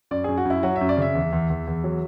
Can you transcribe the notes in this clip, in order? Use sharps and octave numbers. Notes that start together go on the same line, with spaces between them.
F#2 D5
F#2 G#4
F#4
F#2 E4
F#3 F#4
E5
F#2
D5
C#3 E5
E2
E2
E2
E2
F#3